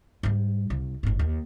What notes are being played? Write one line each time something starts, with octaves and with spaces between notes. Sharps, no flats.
G#2 G3
C2
G1 G#2
D#2